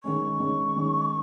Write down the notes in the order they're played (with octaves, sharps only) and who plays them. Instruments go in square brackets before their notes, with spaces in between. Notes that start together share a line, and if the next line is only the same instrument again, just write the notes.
[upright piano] D#3 G#3 C#4 [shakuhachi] C#6
[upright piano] D#3 G#3 C#4
D#3 G#3 C#4